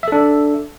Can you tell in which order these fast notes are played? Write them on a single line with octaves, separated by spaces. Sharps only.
E5 A4 D4